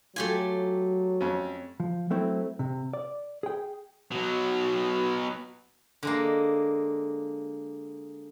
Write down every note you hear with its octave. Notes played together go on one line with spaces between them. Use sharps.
F#3 A3 F4 G4 G#5
F2 C#4
F3
F#3 A3 C4 E4
C3
D5
G#4 G5
B2 F#3
D3 G#3 A#3